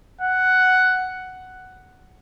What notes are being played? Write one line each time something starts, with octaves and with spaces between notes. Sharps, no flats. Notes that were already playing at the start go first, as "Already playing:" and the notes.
F#5